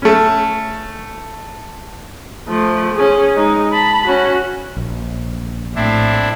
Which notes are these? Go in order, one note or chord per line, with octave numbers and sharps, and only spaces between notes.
A3 C#4
F3 A3
C#4 G#4
G#3 D#4
A5 B5
C#4 F#4
A#1
A2 C4 D4 E4